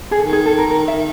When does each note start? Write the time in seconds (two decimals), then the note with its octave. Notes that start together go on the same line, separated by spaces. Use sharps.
0.11 G#4
0.19 D#3 A4
0.32 G#4
0.46 A4
0.58 A#4
0.71 A#4
0.88 E5